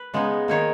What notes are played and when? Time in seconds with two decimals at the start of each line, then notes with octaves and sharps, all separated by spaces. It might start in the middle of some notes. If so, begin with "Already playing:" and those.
Already playing: B4
0.14 C#3 G#3 B3 D#4
0.48 D#3 A#3 D#4 C#5